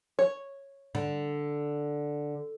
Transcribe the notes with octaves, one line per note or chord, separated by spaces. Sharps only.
C#5
D3